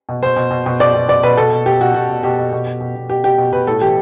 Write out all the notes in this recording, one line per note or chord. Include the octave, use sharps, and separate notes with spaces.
B2
B2 C5
B2
B2
B2
B2 D5
B2
B2 D5
B2 B4
B2 A4
B2
B2 G4
B2 F#4
B2 F#4
B2
B2 G4
B2
B2
B2
B2
B2
B2 G4
B2 G4
B2
B2 B4
A2 A4
E3 G4